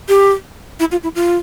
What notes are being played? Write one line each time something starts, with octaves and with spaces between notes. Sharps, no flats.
G4
E4
F4
E4
F4